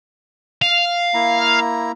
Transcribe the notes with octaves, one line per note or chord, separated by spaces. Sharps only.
F5
A#3 E4 A#5